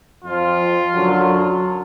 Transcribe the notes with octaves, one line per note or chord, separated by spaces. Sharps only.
F2 F3 F4
F#2 D3 F#3